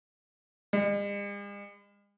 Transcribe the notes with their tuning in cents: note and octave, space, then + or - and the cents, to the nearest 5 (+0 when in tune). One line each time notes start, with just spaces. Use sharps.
G#3 -45